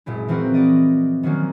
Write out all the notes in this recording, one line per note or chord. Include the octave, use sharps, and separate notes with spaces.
F#1 A#2 G#3 E4
E3 F3 C4 E4 F#4 A#4
F#4 D5 D#5
D#3 F3 F#3 A#3 C#4